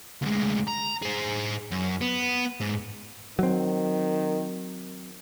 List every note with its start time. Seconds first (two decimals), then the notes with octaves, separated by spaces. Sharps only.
0.22 D2 G#3
0.68 A#5
1.02 G#4 C5
1.72 F#2
2.02 B3
2.60 G#2
3.39 D#3 F#3 C4